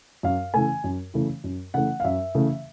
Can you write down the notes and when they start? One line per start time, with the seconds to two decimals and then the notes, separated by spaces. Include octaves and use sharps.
0.23 F#2 F5
0.54 C#3 E3 A3 G#5
0.84 F#2
1.14 C#3 E3 A3
1.44 F#2
1.74 C#3 E3 A3 F#5
2.00 F5
2.04 F#2 E5
2.35 C#3 E3 A3